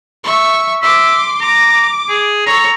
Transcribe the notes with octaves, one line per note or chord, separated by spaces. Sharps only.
E5 C#6
E5 C6 D6
A#5 D6
G#4
A4 C#5 A#5